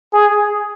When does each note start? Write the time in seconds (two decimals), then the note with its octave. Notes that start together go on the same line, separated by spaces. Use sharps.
0.13 G#4